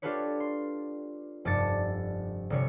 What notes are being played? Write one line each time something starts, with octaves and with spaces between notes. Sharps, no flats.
D4 F4 G4 A4 B4 C#5
C6
F1 G2 D5 A5 A6 C#7
G1 C3 C#5 C#7